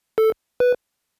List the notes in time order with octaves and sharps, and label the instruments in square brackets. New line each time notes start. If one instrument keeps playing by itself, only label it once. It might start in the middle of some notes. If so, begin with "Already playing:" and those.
[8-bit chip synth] A4
B4